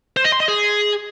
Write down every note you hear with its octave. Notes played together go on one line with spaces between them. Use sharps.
C5
D#5
C6
D#5
G#4